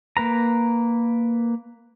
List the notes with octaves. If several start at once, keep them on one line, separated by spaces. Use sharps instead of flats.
A#3 B4 A#5